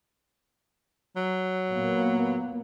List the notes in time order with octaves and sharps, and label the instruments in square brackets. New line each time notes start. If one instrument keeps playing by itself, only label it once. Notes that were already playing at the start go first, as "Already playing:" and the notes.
[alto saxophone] F#3
[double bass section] A#2 A#3 B3